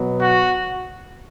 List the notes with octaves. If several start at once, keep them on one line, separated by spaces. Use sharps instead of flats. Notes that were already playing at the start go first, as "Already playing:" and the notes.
Already playing: B2 F#3 B3
F#4